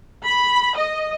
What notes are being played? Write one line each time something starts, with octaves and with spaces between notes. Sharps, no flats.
B5
D#5